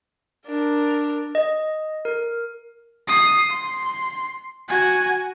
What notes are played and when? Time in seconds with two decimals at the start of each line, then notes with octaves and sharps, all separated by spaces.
0.46 D4 A#4
1.35 D#5
2.05 A#4
3.08 D#6 C7
3.50 C6
4.68 F#4 G#5